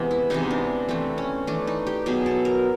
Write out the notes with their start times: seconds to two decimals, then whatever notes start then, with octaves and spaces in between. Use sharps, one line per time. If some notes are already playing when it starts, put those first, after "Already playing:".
Already playing: C3 E3 G#3 B3
0.11 E4
0.30 C3 E3 G#3 B3 D#4
0.51 D4
0.89 E3 A3 C4
1.18 C#4
1.47 E3 A3 D4
1.67 D#4
1.87 G4
2.06 B2 F#3 B3 G#4
2.26 A4
2.45 A#4